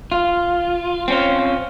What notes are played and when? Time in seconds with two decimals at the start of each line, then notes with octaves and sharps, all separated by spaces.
0.12 F4
1.08 C4 C#4 F4